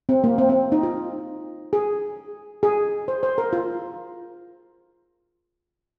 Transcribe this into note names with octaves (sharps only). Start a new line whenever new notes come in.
C4
A#3
C4
C4
D#4
F4
G#4
G#4
C5
C5
A#4
F4